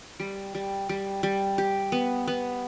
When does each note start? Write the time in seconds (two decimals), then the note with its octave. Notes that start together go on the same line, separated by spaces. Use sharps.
0.20 G3
0.55 G3
0.89 G3
1.23 G3
1.58 G4
1.92 B3
2.28 B3